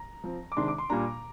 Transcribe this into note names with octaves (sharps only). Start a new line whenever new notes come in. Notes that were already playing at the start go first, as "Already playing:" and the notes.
Already playing: A#5
F3 C4
D6
C3 D#3 G#3 D4 C6
D6
C6
A#2 G3 A#3 D4 A#5